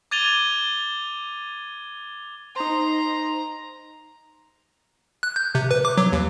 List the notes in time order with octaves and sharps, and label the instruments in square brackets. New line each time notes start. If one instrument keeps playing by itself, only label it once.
[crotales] D6 G#6 A6 D#7 F7 G7
[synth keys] D#4 C5 [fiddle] A#5 [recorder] C6
[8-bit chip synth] F#6
G6
C3
B4
D6
F#3
D#2